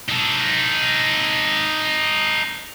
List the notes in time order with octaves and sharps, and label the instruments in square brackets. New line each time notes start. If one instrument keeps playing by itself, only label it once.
[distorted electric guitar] D#4 A4